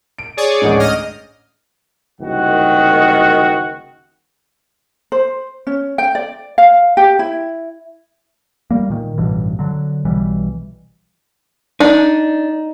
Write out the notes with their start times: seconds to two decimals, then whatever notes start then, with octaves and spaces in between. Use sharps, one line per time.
0.18 D7
0.37 G#4 C#5 D5
0.62 A1 D2 G#2
0.80 D#5 F6
2.20 F#1 C2 D#3 F#4 F#5
5.12 C5
5.67 C#4
5.98 G5
6.15 D5
6.58 F5
6.97 G4
7.19 E4
8.71 G3 A#3
8.90 A#2 D#3
9.18 A1 G2 B2 E3
9.59 D3 F#3
10.05 B1 B2 E3 G3
11.80 D4 D#4